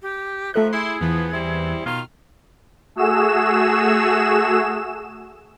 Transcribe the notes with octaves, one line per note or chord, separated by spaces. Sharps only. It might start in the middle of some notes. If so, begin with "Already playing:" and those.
G4
D#3 F3 A3 A4 E5 F#6
E4 G#4 C6
E2 E3 F3 B3
G3 C4 E4
B2 D#3 F4 F6
A3 F#4 G#4 E6 E7